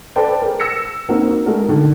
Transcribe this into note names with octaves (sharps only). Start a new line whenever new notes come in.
A4 B4 C5 D5 G5 A5
G#4 A#4
E6 A#6 C#7
A#3 C4 D#4 F#4 A#4
G#3 A3 F#4 A#4
D3 D#3